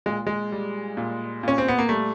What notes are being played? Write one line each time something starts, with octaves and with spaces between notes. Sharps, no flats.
A#2 G#3
G#3
G3
A#2
A#2 C#4
C4
B3
A#3
G3 A3